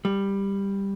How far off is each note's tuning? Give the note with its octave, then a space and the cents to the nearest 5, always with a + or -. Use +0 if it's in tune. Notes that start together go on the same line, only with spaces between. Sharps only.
G3 +10